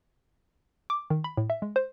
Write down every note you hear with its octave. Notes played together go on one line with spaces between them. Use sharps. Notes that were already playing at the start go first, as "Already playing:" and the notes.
D6
D#3
B5
A2
E5
G#3
C5